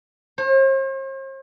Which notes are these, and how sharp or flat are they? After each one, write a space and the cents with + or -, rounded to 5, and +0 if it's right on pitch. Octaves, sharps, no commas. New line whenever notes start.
C5 +45